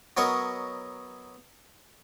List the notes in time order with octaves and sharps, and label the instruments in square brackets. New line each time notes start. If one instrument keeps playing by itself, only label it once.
[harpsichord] F#3 B3 A#4 C#5 D#5 C#6